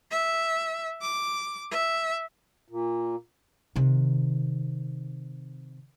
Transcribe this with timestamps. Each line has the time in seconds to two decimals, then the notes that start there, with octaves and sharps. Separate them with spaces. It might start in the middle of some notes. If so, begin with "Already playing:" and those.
0.11 E5
1.02 D6
1.71 E5
2.68 A#2
3.76 C3 D#3